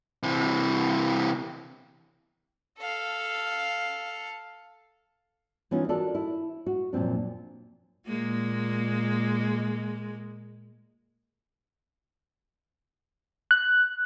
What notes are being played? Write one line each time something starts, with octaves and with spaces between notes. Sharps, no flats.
C3 E3
A4 F5
E3 B3 C#4 D#4 F4
D4 F4 F#4 A4 A#4 D5
E4
F#4
F#2 A#2 F3 C4 D4
A#2 G#3 A#3
F#6